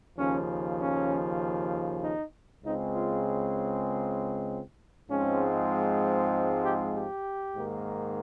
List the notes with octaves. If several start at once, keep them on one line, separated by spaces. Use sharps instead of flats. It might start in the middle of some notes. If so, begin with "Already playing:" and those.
D#2 C#3 F3 C#4
C#4
D#4
C#2 C#3 G#3 C4 D#4
F4
G#2 F3 G#3 C4 C#4
G4
G4
G#2 D#3 A#3